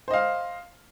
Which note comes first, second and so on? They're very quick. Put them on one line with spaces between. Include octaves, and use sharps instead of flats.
C5 D#5 F5